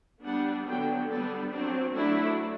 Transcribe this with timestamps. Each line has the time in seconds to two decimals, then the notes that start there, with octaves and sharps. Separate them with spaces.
0.24 G3 B3 D4 F#5
0.68 D3 F#3 B3 D4 G5
1.11 G3 B3 D4 A4
1.52 F#3 C4 D4
1.96 F#3 A3 D4 E4